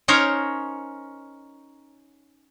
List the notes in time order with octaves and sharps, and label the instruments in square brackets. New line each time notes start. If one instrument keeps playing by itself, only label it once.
[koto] C#4 D#4 A#4 C5 C#5